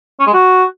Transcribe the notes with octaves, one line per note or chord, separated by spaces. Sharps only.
C#4
G#3
F#4